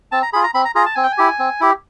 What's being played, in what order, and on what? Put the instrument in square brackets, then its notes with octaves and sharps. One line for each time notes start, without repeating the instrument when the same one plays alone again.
[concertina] C4 A5
A#5
F4 G#4 B5
A#5
C4 B5
A#5
F4 G#4 A#5
A5
C4 G#5
G5
G#5
E4 G4
C4
E4 G4